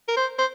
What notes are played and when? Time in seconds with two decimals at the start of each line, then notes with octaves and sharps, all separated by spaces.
0.08 A#4
0.17 C5
0.38 C5